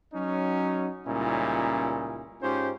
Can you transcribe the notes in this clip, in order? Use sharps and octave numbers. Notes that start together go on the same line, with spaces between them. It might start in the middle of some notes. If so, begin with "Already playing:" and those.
F#3 C#4 D#4
C#2 A#2 G3 C#4 D#4 E4
G#2 C#4 D#4 F4 G4 C5